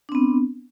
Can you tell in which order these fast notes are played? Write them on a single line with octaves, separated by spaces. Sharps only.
D4 C4 B3